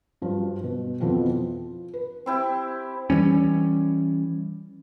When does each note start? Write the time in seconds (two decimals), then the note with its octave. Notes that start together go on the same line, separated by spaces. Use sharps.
0.22 G2 F3 F#3
0.64 B2
1.00 F2 B2 E3 F3 B3 C4
1.28 F3
1.94 B4
2.26 C4 E4 G4
3.10 E3 F3 G3 C#4